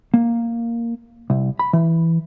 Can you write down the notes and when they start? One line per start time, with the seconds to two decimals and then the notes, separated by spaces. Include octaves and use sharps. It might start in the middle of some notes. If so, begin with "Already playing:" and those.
0.14 A#3
1.30 C2
1.59 B5
1.73 E3